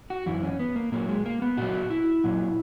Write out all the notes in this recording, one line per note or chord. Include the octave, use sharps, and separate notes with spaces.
F#4
F#2 E3 E4
C#4
B3
A#3
A#2 F#3 A#3
G#3
A#3
B3
A#2 F#3 F#4
E4
A#2 F#3